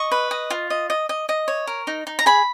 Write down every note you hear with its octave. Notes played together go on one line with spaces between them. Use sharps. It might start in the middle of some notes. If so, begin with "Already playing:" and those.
Already playing: D#5 C#6
B4
D#5
F4
D#5
D#5
D#5
D#5
C#5
A#4
D#4
D#4
A#5
G#4 B5